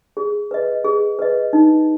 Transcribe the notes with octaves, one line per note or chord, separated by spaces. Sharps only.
G#4
B4 D#5
G#4
B4 D#5
D#4